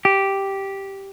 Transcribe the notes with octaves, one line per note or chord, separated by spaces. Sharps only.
G4